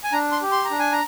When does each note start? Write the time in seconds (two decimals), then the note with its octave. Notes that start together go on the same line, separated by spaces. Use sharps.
0.04 G#5
0.12 D4 A#5
0.32 C6
0.42 G4
0.52 C6
0.65 A#5
0.71 D4
0.79 G#5
0.92 A#5